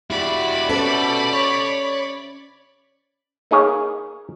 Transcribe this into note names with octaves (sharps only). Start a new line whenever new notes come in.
E4 F#4 G4 D5 B5
C#4 F#4 A4 B4 C5 E5
C#5
A#3 D#4 G#4 C#5 F5 G#5